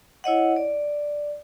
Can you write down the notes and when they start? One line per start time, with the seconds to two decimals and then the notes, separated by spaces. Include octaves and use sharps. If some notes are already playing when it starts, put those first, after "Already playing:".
0.24 E4 C#5 D#5 F#5
0.56 D5